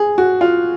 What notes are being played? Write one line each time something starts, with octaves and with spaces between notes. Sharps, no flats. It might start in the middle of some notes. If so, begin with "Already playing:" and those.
Already playing: G#4
F#4
F4